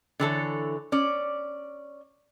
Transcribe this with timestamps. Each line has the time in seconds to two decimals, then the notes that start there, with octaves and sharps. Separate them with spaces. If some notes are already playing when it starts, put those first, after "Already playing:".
0.20 D3 E3 A4 C#5
0.92 C#4 D5